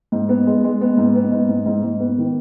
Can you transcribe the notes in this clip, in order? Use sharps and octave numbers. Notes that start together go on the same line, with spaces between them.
G#2
B3
G#3
G#3
B3
G#2
B3
G#2
G#2
G#2
G#2
B3
D#3